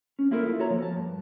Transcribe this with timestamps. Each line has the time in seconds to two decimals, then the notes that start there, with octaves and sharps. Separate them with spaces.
0.19 C#4
0.31 A#3 E4 F4 A4 A#4
0.59 F#4 A4 C#5 A#5
0.70 F3 A#3
0.82 A5
0.96 G2